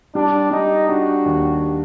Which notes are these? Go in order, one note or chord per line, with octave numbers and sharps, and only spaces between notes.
G3 D4
G3 D#4
D4 F#4
D#2